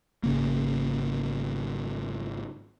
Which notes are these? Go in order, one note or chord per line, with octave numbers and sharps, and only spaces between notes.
G#1 C#3 A#3